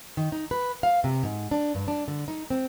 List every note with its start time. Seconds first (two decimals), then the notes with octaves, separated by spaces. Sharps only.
0.17 D#3
0.32 D#4
0.51 B4
0.83 F5
1.04 C3
1.23 G#2
1.51 D4
1.75 G2
1.88 D4
2.08 D3
2.28 D#4
2.50 C4